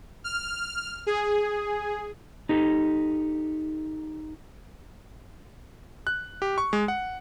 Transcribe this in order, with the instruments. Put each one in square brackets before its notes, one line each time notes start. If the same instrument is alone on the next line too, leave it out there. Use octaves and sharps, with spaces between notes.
[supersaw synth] F6
G#4
[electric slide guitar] D#4 G4 A4
[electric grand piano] F#6
G4
C#6
G#3
F#5